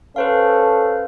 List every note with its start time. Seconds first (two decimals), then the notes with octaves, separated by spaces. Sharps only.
0.16 C#4 A4 B4 C5 F5